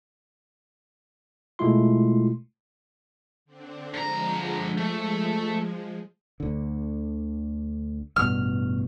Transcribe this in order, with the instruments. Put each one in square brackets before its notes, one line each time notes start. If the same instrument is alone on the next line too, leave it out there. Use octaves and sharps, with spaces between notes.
[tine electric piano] B2 G#3 A3 E4 F4 C6
[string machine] D3 C4 D4
[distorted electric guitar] D3 A#5 [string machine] F3 G#3
[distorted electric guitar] A3
[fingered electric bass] D2 D3
[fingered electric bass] A1 G2 B2 [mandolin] F6